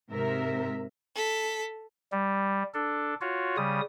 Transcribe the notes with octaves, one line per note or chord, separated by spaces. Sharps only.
G#2 C3 A#4 E5
A4 B6
G3
D4 A4
F4 F#4 C#5
C#3 G3 D#6